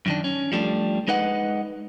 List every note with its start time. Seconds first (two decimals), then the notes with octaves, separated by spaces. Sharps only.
0.06 F#2 D#3 D4
0.24 C#4
0.52 F3 G3 A3 D4
1.08 G#3 D#4 B4 D#5 F#5